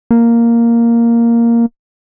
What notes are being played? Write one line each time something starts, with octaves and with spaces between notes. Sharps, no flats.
A#3